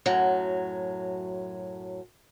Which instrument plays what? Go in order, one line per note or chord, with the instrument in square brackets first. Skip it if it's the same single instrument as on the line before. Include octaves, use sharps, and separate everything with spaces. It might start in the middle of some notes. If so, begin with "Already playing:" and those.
[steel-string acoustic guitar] F#2 A2 F#3